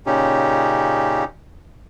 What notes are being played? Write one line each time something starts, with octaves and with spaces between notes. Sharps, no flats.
A#2 C#3 C#4 D#4 G4